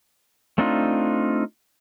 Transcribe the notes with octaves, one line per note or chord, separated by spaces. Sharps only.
A3 C4 D4 D#4 F4